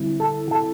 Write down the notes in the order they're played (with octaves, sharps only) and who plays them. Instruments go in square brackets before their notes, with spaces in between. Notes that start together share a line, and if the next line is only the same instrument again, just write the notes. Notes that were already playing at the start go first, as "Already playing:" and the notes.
Already playing: [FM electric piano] D3 G3 C4 E4
[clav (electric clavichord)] A4
A4